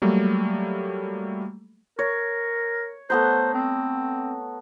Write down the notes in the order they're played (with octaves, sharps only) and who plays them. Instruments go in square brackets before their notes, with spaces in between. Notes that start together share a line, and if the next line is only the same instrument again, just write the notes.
[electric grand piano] F#3 G3 A3 A#3
[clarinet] A#4 [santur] C#5
[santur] A3 B3 A#5 [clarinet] C5
[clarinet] C4